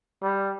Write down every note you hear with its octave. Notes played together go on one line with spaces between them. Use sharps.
G3